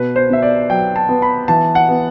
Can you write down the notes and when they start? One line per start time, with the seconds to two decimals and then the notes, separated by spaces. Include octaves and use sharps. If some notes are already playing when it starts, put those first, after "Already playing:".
Already playing: B2 B4
0.16 C5
0.30 B2 E5
0.42 D5
0.70 F#3 G5
0.96 A5
1.09 B3
1.22 B5
1.48 E3 A5
1.75 F#5
1.89 B3